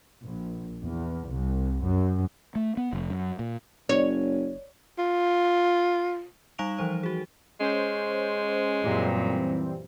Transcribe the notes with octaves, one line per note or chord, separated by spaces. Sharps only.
A#1
E2
C2
F#2
A3
B3
F1
F#2
A#2
F#1 C#5
F4
G3 D#4 F5 C#6 D7 F7
E3 F3 C5
F#4 G#4
G#3 C#4 C5
F#2 A#2 E3 G3 C4